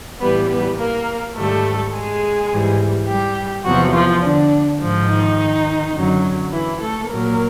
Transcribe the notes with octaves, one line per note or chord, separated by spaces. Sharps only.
A2 E3 G3 B3 B4
B3 B4
A#3 A#4
G#2 D#3 G3 A3 A4
G#3 G#4
G#2 E3 G3
G3 G4
E2 C3 F3 F#3 F#4
F3 F4
D3 D4
G#2 F3
D#3 D#4
F#2 D3 F#3
E3 E4
A3 A4
A#2 F#3 A#3 A#4